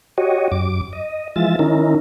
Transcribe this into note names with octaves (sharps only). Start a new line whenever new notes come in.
F#4 G4 C#5 D#5
F#2 D6
D#5
E3 F3 G#3 F4 E5 A6
D#3 C#4 D#4 E4 A#4